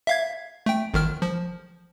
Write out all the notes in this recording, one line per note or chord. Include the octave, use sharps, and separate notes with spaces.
E5 F5 G#6
A3 G5
G1 D#3 F6
F3